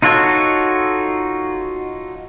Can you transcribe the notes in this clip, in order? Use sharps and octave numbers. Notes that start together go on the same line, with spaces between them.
D#4 F4 F#4 A4 C#5